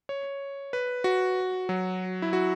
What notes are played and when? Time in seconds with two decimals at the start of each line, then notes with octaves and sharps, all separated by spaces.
0.09 C#5
0.73 B4
1.04 F#4
1.69 F#3
2.22 E4
2.33 F#4